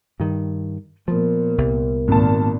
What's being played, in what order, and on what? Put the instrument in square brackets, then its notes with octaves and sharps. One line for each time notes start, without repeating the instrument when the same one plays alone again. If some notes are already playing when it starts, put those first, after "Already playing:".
[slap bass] G2 D#3
[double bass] A#2 [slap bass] F3 [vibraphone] B3 A#4
[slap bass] C2
[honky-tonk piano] G#1 A5 [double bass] A#2